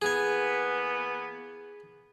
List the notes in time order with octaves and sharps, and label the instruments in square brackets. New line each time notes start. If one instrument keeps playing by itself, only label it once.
[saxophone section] E3 A#3 B3 [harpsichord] G#4 G#5